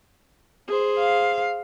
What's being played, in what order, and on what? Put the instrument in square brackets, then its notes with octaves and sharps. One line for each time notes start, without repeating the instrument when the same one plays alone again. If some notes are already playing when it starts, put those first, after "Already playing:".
[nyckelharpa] G#4 C5
[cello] F5